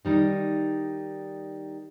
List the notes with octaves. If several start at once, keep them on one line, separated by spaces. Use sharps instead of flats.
D#3 G3 D#4